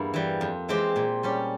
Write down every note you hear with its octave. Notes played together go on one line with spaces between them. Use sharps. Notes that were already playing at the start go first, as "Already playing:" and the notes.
Already playing: E2 G2 A#3 E4
E3 G3
F2
E3 G#3 C4 G4
A#2
G3 C#4 G4